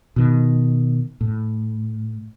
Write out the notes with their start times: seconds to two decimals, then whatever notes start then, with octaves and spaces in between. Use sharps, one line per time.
0.16 B2 D#3
1.21 A2